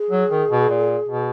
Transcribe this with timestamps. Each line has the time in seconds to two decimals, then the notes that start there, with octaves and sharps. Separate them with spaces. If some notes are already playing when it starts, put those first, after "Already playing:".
Already playing: G#4
0.10 F#3
0.30 D#3
0.51 B2
0.69 A#2
1.09 B2